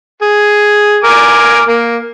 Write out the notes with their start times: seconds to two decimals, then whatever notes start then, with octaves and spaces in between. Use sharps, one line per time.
0.22 G#4
1.04 A#4 G#5 D6
1.68 A#3